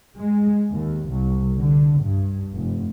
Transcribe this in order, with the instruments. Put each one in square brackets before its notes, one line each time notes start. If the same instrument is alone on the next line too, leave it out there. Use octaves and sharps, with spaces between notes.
[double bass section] G#3
D#2
C2
D3
G2
F1